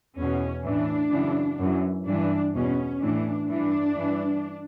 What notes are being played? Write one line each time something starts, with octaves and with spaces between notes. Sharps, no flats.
E2 B2 C#4
A2 E3 D4
F#2 C#3 E3
F#2 E3
G2 E3 D4
E2 B2 C#4
A2 E3 D4
G2 E3 D4
G2 E3